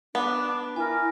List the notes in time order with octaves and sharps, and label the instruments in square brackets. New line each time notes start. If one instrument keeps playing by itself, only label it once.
[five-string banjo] B3 [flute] D4
[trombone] E4 [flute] A#4 [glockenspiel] G#5 F6